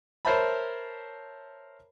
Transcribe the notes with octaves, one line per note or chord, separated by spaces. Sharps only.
A#4 C5 C#5 E5 A5 B5